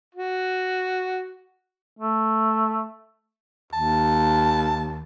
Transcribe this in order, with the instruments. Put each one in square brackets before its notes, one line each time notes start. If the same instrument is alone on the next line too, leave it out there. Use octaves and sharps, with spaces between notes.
[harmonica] F#4
[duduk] A3
[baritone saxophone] D#2 [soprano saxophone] A5